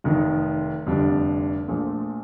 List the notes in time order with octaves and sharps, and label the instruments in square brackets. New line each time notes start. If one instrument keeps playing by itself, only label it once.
[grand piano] F1 F2 D#3
F1 F2 D3 G3 D4
A#1 A#2 F3 A3